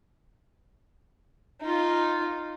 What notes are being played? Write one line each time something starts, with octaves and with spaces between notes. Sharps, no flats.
D#4 F4